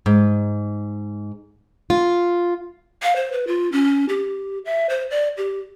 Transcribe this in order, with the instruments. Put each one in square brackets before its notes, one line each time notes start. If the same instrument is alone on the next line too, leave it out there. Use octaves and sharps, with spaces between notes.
[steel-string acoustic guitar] G#2
F4
[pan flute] F5
C5
B4
F4
C#4
G4
E5
C5
D5
G4